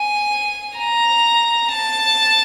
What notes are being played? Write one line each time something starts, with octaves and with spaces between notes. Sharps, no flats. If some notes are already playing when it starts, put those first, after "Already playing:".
Already playing: G#5
A#5
A5